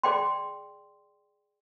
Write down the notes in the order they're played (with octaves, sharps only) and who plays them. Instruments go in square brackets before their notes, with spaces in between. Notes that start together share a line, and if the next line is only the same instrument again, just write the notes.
[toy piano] G#4 D5 G5 C6